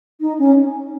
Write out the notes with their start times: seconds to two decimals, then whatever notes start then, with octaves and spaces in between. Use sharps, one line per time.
0.20 D#4
0.38 C#4